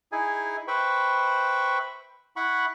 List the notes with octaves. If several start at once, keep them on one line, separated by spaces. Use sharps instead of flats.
D#4 E4 G#4 G#5
B4 C5 E5 G5 B5 C#6
E4 F#5 B5 C#6